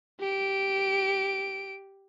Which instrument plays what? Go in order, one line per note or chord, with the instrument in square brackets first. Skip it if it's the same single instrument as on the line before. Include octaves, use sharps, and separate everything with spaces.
[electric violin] G4 D7